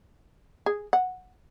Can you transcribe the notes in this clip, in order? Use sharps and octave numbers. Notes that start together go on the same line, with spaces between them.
G#4
F#5